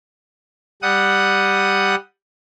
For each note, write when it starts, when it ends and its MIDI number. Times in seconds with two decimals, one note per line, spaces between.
0.82 1.95 55
0.82 1.95 78
0.82 1.95 87